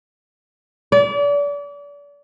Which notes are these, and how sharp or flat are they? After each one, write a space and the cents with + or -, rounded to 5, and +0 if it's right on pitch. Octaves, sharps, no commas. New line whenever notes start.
D5 -35